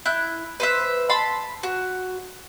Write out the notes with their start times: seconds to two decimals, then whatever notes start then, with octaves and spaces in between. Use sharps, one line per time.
0.05 E4 F#6 G6
0.60 B4 C5 E5
1.09 A5 B5 C6
1.63 F#4